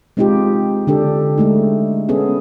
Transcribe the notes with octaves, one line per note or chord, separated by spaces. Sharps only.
G#3 C4 D#4 F4 G4
D3 D4 G4 A4
G#3 A3 D#4
B3 C#4 G#4 A4